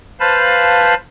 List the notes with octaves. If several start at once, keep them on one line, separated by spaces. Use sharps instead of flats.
B4 C5 F5 A5 B5